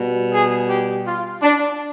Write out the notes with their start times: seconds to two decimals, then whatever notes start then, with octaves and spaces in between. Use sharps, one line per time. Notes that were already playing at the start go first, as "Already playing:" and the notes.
Already playing: B2 G3
0.32 G#4
0.68 G4
1.05 F4
1.42 D4